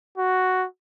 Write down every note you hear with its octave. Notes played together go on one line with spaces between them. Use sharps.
F#4